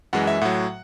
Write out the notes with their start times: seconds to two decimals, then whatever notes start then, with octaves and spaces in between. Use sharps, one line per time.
0.13 F#2 E3 G#3 F#5
0.27 E5
0.41 A2 F#3 F#5